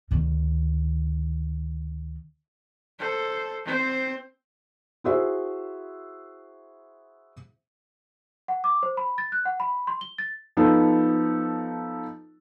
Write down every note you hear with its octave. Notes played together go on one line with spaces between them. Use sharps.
D2 D#3
A4 C5
C4 C5
E4 F#4 G#4 C5 E5
F#5
D6
C5
B5
A6
F#6
F#5
B5
C6
G7
A6
F3 B3 D#4 A4